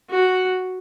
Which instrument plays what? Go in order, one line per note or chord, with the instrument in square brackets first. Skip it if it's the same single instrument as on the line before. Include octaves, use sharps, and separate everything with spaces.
[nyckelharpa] F#4